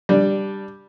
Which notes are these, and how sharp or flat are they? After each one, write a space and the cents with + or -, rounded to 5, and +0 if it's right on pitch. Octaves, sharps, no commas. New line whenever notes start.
G3 +0 D4 +0